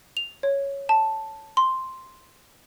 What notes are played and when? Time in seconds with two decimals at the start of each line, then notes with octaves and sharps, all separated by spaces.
0.17 F7
0.43 C#5
0.89 A5
1.57 C6